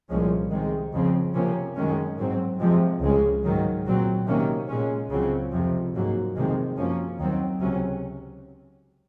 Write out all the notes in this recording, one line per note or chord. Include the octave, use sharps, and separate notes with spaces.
C2 A#2 F3 G#3 C#4
C3 D#3 G#3
F2 C#3 F3 C4
C3 F3 A#3 C#4
F#2 D#3 G#3 C#4
G#2 F#3 C4
F2 C3 F3 G#3
C#2 C#3 G#3
G#2 D#3 F#3
A#2 F#3 C4
C3 D#3 A#3 C#4
A#2 G#3 C#4
C#2 C#3 F#3 C4
F2 C3 F3
G#2 F#3 A#3
F2 C3 D#3 G#3
F#2 F3 A#3 C#4
D#2 D#3 F#3 C4
C#2 C3 F#3 C#4